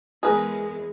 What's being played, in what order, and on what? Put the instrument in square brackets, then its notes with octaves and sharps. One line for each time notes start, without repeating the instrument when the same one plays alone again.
[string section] E2 G#3 [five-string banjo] G#4 A#4 B4